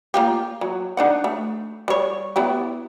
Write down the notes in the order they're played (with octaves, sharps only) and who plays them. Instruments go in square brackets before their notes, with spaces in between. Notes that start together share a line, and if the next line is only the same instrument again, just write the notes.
[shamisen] A#3 F4 G4
F#3
D4 D#4 F#5
A3
G3 C#5
B3 E4 G4